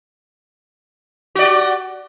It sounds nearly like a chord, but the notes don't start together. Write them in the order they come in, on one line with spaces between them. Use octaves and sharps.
F#4 D5 G4